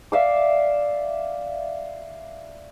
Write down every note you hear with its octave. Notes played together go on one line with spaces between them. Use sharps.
D5 E5 F5 D6